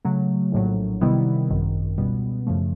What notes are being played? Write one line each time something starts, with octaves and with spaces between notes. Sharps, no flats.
C#3 F#3 A3
A#1 A2 F#3
C3 D#3 G3 B3 E4
G#1 F#2 D#3
C#2 B2 G3 B3
F#2 C#3 F3 A3